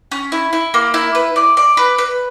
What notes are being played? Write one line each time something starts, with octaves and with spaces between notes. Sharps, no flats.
C#4
E4
E4
A#3
E4
B4
D5
D5
B4
B4